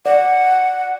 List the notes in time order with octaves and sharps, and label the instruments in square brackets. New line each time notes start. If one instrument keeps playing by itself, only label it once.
[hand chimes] D5 [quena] F#5